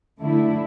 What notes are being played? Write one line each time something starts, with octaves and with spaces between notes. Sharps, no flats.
D3 A3 E4